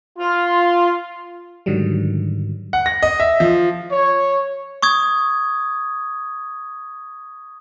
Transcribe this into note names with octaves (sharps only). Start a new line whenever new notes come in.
F4
G#2 D3 D#3 F#3 G3
F#5
A#6
D#5
E5
F3
C#5
C#6 D#6 G#6